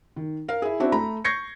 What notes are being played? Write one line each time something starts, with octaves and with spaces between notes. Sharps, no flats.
D#3
A#4 F5
E4 G#4
C4 D4 E4 F#4
A3 A#5 B5
C#6 G6 G#6 A#6 C7 C#7